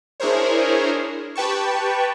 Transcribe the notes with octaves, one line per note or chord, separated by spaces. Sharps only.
D4 E4 G#4 A#4 C5 C#5
G4 B4 G5 A5 C#6